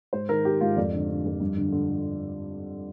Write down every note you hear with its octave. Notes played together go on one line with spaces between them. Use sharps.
G#2 C5
D#3 A#4
D#3 G4
G#2 F4
F2 D5
D3
D3
F2
G2
D3
D3